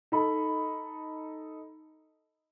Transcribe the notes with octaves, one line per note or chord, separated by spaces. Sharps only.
D#4 A4 B5